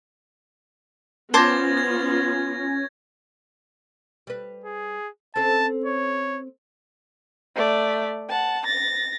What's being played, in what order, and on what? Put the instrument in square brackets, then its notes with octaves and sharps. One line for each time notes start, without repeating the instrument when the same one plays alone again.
[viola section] B3 F4 [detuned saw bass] C#4 [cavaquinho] C5 A5 D6 [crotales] G#6 A#6
[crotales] G#6
[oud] G3 B4
[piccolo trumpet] G#4
[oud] C4 C#4 A4 [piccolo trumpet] A5
[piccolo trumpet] C#5
[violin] A3 D5
F#5 A5
A6 A#6